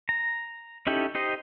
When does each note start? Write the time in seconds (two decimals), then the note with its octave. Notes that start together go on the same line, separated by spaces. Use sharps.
0.09 A#5
0.87 C#4 D#4 E4 G4 A4
1.15 D#4 G4 C5 D#5